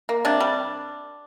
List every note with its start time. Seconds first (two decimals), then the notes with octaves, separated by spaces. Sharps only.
0.09 A#3
0.25 C3 D4
0.41 G3